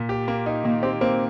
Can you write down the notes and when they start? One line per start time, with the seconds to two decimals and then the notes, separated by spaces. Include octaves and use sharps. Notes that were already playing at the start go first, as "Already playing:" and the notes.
Already playing: A#2
0.09 G4
0.28 A#3
0.46 D#4
0.64 D#3 A#3
0.83 C4 G4
1.01 A#3 C4